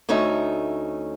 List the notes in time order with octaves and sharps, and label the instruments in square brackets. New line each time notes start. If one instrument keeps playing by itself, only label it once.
[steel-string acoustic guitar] D2 A3 C#4 D#4 E5